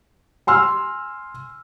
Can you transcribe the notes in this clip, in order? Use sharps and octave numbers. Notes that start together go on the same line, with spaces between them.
G#5 C6 E6 F6